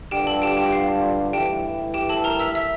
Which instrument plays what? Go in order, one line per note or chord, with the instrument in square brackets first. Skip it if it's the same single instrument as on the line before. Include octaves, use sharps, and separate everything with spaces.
[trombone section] G2 D3 G3 D4 F4 [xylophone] G4 G5
[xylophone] A4 A5
G4 G5
G4 G5
F5
[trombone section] G2 E3 A3 E4 [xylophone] G4 G5
[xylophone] G4 G5
A4 A5
A#4 A#5
E5 E6
E5 E6